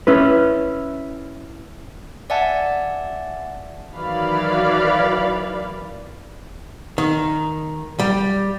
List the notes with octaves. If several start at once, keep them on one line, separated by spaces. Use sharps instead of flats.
C#4 E4 B4
D5 E5 F#5 G#5 A5
D#3 E3 F#3 D5 F5 B5
D#3
G3